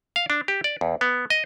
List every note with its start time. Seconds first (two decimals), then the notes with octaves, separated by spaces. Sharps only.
0.16 F5
0.30 D4
0.48 G4
0.64 D5
0.81 E2
1.01 B3
1.30 D#5